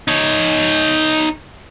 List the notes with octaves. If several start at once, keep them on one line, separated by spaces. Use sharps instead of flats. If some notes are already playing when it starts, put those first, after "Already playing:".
D#4 C#5